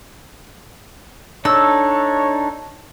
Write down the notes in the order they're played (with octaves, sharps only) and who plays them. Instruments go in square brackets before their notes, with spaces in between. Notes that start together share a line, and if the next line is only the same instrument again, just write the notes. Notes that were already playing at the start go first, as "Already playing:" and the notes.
[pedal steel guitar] D4 D#4 A4 [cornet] C#5 [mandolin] E6